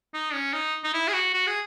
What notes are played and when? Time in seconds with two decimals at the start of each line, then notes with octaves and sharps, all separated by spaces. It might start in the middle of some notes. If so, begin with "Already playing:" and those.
0.14 D#4
0.34 C#4
0.53 D#4
0.84 D#4
0.94 E4
1.08 G#4
1.13 F#4
1.34 F#4
1.47 G#4